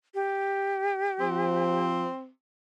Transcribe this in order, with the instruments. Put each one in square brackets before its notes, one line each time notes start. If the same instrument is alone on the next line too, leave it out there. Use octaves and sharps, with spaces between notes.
[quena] G4
[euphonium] F3 [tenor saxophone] C4